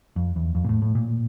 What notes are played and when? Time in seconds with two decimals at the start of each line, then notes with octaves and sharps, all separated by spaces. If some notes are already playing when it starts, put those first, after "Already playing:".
0.16 F2
0.36 E2
0.55 F2
0.64 A#2
0.69 A2
0.82 A2
0.95 A#2